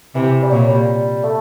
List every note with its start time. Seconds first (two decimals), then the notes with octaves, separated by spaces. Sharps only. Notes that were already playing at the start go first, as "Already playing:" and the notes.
0.15 C3 E3
0.42 G3
0.51 A#2 F#3
0.69 G3
1.24 A3